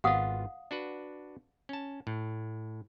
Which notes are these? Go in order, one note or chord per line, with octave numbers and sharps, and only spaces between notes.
G#1 B3 F4 F5 F#5 D#6
D4 F#4 B4
C#4 A5
A2